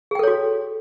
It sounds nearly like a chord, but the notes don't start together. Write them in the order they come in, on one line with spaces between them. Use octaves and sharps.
G#4 G5 A4 C#5 F#4